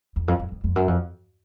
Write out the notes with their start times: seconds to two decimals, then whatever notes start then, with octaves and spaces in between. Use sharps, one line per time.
0.16 E2
0.28 F2
0.39 F2
0.51 F2
0.64 F2
0.76 F#2
0.88 F2